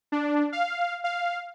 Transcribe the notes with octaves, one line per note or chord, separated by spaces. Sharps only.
D4
F5
F5